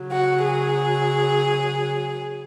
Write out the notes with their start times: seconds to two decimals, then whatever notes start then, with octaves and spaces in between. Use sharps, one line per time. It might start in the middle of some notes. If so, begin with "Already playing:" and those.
Already playing: C#3 F#3
0.11 F#4
0.44 G#4